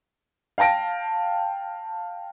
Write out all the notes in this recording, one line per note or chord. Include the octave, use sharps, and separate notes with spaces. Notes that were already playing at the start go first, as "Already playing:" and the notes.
F5 G5 A5 A#6 D7